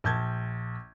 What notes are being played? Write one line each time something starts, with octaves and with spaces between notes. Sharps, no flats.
A#1 A5 G6 G#6